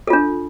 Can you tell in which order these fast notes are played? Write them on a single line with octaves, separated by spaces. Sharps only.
A4 F4 D4